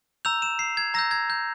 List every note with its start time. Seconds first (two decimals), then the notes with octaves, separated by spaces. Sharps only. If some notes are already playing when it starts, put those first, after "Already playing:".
0.25 A#5 E6 G6 F7
0.42 E7
0.59 C7
0.77 G#6
0.94 A#5 E6 G6 A#6
1.11 G#6
1.30 G6